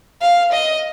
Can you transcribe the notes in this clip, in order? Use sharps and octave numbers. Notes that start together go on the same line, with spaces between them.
F5
D#5